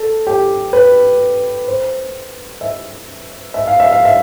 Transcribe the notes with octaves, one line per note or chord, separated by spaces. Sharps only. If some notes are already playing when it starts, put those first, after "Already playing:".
Already playing: A4
G4
B4
C5
E5
E5
F5
E5
F5
E5